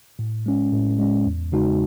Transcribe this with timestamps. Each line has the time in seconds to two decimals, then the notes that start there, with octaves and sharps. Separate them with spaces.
0.19 A2
0.46 G#3 C#4
0.73 A2
0.99 G#3 C#4
1.26 E2
1.52 C#3 G#3 D#4 F#4